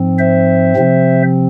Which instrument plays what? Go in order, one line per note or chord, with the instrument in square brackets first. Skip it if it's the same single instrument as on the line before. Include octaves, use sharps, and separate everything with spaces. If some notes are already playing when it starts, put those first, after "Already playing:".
Already playing: [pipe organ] G#2 F3 C4
C5 E5
C3 F3 C4